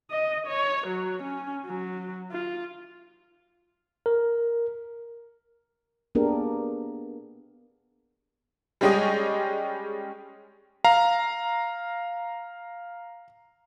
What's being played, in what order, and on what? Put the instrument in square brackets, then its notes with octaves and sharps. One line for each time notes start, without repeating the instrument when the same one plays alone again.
[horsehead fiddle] D#5
C#5
F#3
C#4
F#3
F4
[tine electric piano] A#4
[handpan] A#3 B3 D4 G4 G#4 A#4
[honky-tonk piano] G3 G#3 C#4 G4 G#4 D#5
[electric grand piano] F5 A#5